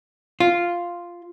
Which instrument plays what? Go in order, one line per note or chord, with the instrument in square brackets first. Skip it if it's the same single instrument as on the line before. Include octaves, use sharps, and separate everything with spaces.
[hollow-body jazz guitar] F4